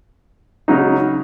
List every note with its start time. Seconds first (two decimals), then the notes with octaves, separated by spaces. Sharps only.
0.68 C#3 F#3 D#4